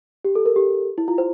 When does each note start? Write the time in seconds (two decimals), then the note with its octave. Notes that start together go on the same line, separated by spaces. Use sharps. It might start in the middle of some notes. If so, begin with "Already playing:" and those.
0.25 G4
0.35 A4
0.46 A#4
0.56 G4
0.98 E4
1.08 F4
1.18 C5